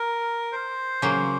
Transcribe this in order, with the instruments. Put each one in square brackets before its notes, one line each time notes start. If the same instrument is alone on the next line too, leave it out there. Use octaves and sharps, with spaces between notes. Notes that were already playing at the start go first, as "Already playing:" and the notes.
Already playing: [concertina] A#4
C5
[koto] C#3 F#3 A#3